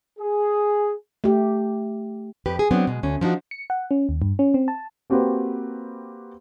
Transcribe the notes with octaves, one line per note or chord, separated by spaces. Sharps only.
G#4
A3 G4
F2 G4 B4
G#4
F#3 B3 C4 D4
B2 G#3
D2 C#4
F3 D4 D#4 F#4
C#7
F#5
C#4
D#2
G2
C#4
C4
A5
A#3 C4 F#4 G4 B4 C5